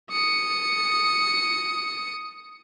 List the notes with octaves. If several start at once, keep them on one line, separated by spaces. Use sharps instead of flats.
D#6 C#7